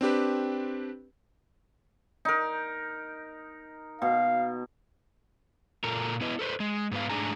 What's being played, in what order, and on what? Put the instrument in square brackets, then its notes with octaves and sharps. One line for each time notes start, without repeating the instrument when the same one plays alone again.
[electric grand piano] C4 D4 G4 B4
[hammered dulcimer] D#4 A#4
[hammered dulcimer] B2 [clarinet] F5
[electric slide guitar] A#2 A4 A#4
B3 E4 B4 D#5
A4 B4 C5
G#3
G#2 B3 F5
G#2 A3 D4 G#4 G#5 A#5